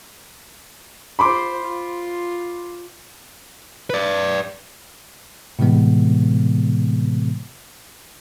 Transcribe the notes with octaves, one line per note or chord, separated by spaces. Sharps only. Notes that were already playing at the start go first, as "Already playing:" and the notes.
F4 C5 B5 C6 D6
F4
B4 D5
A2 C3 E3 G#3 B3